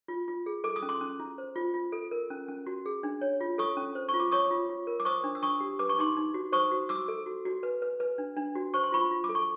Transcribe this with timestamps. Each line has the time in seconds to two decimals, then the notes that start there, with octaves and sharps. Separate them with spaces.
0.08 F4
0.28 F4
0.46 G#4
0.64 A4 D6
0.76 D#6
0.82 C#4
0.89 C6 D6
1.01 C#4
1.19 E4
1.38 C5
1.56 F4
1.74 F4
1.92 A4
2.11 A#4
2.30 C#4
2.48 C#4
2.66 F#4
2.86 G#4
3.03 D4
3.21 C#5
3.41 F4
3.58 A4 C#6 D#6
3.77 C#4
3.95 C5
4.09 C#6
4.14 F4
4.20 D6
4.32 C#5 C#6 D#6
4.51 F4
4.69 F4
4.87 A#4
5.00 D6
5.05 C5 C#6 D#6
5.24 D4
5.35 E6
5.42 D4 C#6 D#6
5.60 G4
5.79 B4 D6
5.89 C#6
5.98 D#4 C6 D6
6.17 D#4
6.34 F#4
6.52 C5 C#6 D#6
6.71 F#4
6.89 F#4 D6 E6
7.08 A4
7.26 F#4
7.45 F#4
7.63 B4
7.82 B4
8.00 B4
8.18 D4
8.37 D4
8.55 F#4
8.74 C5 C#6
8.83 C6
8.92 F4 B5 C#6
9.11 F4
9.24 D6
9.29 A4
9.35 C#6